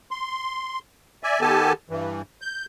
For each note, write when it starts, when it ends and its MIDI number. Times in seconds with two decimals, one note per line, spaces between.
0.11 0.79 84
1.23 1.41 74
1.23 1.41 76
1.23 1.41 80
1.41 1.73 51
1.41 1.73 59
1.41 1.73 67
1.41 1.73 69
1.41 1.73 80
1.41 1.73 81
1.90 2.22 43
1.90 2.22 52
2.42 2.66 91